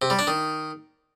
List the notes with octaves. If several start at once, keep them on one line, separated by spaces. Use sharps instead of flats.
C3
G3
D4
D#3